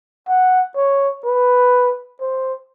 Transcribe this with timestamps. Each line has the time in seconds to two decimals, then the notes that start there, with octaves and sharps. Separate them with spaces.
0.28 F#5
0.76 C#5
1.25 B4
2.21 C5